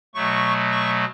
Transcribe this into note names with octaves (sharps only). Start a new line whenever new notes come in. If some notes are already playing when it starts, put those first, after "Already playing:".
B2 F#3 A3 C#6
C#6